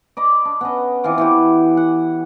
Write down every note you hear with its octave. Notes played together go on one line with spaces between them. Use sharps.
D5 D#5 B5
D4
B3 C#4 D#5
E3 C4 F4 D6
E3 B3 G4
F#5